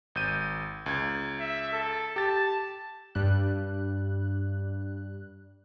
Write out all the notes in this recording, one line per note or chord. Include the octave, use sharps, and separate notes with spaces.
G#1 G6 D#7
C#2 G#6
E5
A4
G4 A5 A6
G2 G3 F#6